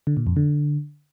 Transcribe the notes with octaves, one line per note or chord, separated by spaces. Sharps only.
D3
A#2
F2
D3